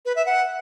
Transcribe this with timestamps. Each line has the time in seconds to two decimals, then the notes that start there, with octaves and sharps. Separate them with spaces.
0.05 B4
0.16 E5
0.26 F#5